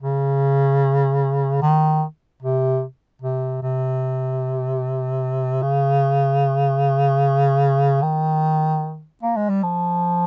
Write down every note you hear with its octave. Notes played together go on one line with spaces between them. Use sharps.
C#3
D#3
C3
C3
C3
C#3
D#3
A#3
G#3
G3
F3